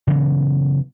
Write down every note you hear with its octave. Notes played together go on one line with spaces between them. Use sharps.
C#3 E3 F#3 B3